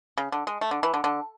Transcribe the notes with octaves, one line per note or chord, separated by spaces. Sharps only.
C#3
D3
G#3
A3
D3
E3
D3
D3